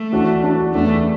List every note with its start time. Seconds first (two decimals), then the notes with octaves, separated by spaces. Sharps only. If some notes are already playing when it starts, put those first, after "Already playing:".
Already playing: A3
0.12 E3 D4 F#4
0.43 E3 D4 F#4
0.74 E2 E3 A3 D4